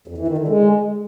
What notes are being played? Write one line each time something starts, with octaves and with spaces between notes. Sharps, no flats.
F2
E3
D#3
D3
G#3